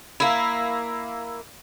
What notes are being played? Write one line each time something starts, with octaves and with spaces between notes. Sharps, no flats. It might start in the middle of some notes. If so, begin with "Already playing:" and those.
A#3 E4